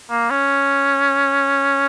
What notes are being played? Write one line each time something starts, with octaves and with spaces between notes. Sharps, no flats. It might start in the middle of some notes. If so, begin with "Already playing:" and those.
A#3
C#4